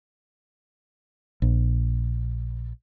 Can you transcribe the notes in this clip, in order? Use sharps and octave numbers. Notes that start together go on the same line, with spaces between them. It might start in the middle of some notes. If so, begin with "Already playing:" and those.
A#1